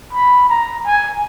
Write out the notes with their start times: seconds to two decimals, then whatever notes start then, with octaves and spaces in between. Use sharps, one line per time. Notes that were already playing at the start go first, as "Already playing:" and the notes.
0.13 B5
0.49 A#5
0.86 G#5